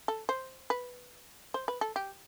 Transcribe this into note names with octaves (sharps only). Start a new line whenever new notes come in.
A4
C5
B4
C5
B4
A4
G4